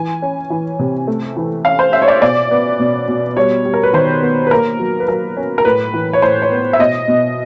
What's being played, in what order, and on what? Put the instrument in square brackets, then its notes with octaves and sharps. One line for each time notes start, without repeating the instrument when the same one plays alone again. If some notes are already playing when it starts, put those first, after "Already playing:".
Already playing: [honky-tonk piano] E3 G#5
C#4
E3
C3
A3
E3
C#4 F5
C5
C#4 E5
C#5
D5
B2 D5
B3
B2
B2
G3 C#5
G3
A#4
B4
D#3 C5
B3
B4
A#3 A#4
F#3
B4
F#3 A#4
C#4
A#4
A2 B4
E3
C#5
A2 C5
C#5
B3
E5
B2 D#5
B2